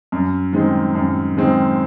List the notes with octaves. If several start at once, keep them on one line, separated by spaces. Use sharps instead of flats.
F#2
D#3 G#3 C4
F#2
D#3 G#3 C4